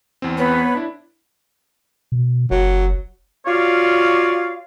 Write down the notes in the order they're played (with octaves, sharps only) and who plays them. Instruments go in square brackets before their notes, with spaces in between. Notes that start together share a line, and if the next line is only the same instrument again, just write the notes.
[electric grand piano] E2 C4
[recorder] B3 [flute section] B4 C#5
[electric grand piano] D4 E4
[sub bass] B2
[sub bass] F#1 [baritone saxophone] F#3
[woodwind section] F4 F#4 C#5 D5 F5